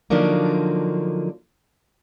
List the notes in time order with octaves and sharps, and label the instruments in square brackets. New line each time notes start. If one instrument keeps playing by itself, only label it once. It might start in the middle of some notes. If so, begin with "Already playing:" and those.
[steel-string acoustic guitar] D3 F3 F#3 A#3 D4 D#4